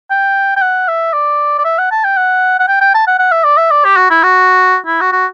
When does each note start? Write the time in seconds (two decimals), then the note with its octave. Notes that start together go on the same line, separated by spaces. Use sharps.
0.11 G5
0.57 G5
0.62 F#5
0.88 E5
1.13 D5
1.58 D5
1.64 E5
1.78 F#5
1.91 A5
2.04 G5
2.17 F#5
2.59 F#5
2.68 G5
2.81 G5
2.94 A5
3.07 F#5
3.19 F#5
3.32 E5
3.44 D5
3.57 E5
3.71 D5
3.85 G4
3.97 F#4
4.10 E4
4.23 F#4
4.87 E4
5.01 F#4
5.12 F#4